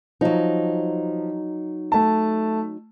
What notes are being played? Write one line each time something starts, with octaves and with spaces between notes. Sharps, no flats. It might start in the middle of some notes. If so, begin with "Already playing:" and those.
F3 F#3 D#4
A3 A5